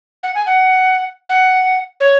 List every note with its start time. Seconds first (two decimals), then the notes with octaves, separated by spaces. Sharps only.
0.23 F#5
0.35 G#5
0.46 F#5
1.29 F#5
2.00 C#5